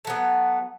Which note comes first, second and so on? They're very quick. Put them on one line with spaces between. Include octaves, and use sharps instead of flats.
A3 F#3 B3